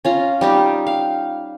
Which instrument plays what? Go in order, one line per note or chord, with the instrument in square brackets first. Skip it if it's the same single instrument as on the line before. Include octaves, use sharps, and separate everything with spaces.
[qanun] C#4 F4 A#5
G3 D#4 G4
F5